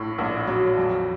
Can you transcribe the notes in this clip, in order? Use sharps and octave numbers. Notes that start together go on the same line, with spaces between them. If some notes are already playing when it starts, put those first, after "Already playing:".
Already playing: A#1 A2
A#1
F#3
F2